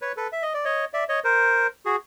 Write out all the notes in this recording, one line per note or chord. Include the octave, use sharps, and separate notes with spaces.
B4 C#5
A4 B4
E5
D#5
D5
C#5 D#5
D5 E5
C#5 D#5
A#4 C5
F#4 G#4